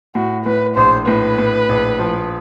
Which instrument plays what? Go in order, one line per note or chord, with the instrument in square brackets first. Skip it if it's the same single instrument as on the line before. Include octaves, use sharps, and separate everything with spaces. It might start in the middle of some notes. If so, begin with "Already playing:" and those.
[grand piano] A2 [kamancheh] F#4
[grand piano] A2 [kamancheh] B4
[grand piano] A#1 [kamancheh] C5
[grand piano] A2 [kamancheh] B4
[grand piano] A2
A#1
F3